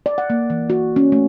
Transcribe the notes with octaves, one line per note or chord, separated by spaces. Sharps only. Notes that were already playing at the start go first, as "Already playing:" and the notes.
D5
F#5
A#3
E3
F#4
C#4
A3